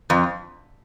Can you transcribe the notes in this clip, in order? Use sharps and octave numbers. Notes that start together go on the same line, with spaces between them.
F2